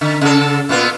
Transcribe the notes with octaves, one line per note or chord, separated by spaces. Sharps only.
D3
C#3 A4
A#2 B3 F4